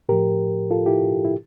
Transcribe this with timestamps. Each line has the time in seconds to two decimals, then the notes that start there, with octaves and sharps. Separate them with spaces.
0.09 A2 F3 G4 A#4
0.71 F4 A4
0.86 E4 G4
1.25 E4